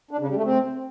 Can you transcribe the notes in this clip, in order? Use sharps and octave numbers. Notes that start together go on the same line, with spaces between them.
D4
C#3
G3
A3
C4